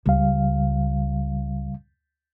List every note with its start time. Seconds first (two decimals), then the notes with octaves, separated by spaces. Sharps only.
0.06 C#2 C#3 G3 F5